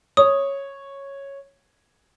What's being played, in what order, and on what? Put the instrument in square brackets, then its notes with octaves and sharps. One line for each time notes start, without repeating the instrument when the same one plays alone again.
[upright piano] C#5 [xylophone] D#6